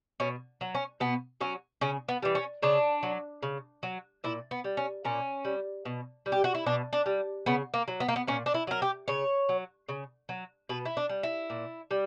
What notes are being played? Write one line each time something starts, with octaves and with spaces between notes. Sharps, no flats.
B2 C#4
F#3
C#4
B2 B3
F#3 C#4
C#3 C#4
B3
E3 G3
C#4
C#3 D4
F#3
C#3
F#3
A#2 E4
B3
G3
C#4
A#2 C#4
G3
B2
G3
G4
F#4
E4
B2 D4
D4
G3
C#3 B3
A#3
F#3
B3
A#3
B3
A#2 C#4
D4
E4
F#3 A#4
G4
C#3 C#5
F#3
C#3
F#3
B2 B4
E4
D4
G3
E4
A#2
G3